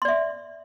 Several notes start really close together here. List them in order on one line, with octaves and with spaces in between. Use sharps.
C6 D5 E5